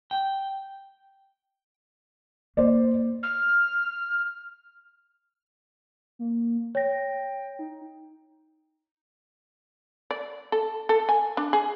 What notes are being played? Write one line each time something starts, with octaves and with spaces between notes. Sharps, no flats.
G5
A#3 D#4 C5 D5
F6
A#3
C#5 G5 A#6
D#4
D5
A4
A4
G#5
D4
G#4